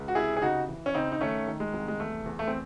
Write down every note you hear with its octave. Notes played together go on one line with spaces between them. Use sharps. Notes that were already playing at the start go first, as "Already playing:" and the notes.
Already playing: C#2
F#4
C3 E4 G#4
G#4
C#3 D#4 F#4
E3
C#4
C#3 C4 D#4
D#4
D#3 A3 C#4
D#3
G#3
C2
G#3
E2 A3
E2
A3
C4